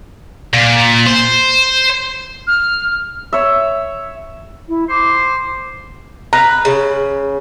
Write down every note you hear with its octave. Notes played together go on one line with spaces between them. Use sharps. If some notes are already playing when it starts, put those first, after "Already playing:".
A#2
C5
F6
C#5 E5
E4
C5 D6
B4 A#5
C#3